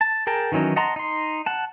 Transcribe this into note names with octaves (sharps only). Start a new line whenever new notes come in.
A5
G#4 A#4 G5 A5
D#3 E3 F#3 C#4 D#4
D#5 F#5 A5 A#5 C6
D#4 C6
F#5 A5